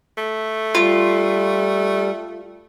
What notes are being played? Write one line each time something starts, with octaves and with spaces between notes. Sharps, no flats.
A3
G3 F4